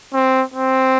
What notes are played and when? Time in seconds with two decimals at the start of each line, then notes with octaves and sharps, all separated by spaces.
0.14 C4
0.54 C4